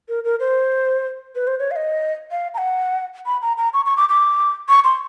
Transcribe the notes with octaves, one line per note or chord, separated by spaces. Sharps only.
A#4
A#4
C5
B4
C5
C#5
F5
D#5
F5
A#5
F#5
B5
A#5
A#5
C#6
C#6
D6
D6
C#6
C6